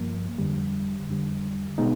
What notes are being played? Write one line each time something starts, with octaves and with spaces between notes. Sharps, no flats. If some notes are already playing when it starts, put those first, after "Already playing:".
Already playing: G2 F3 A#3
F2 D3 G3
F2 D3 G3
B2 G#3 B3 D#4